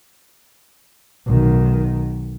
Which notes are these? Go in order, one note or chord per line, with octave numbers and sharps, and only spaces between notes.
B1 D#3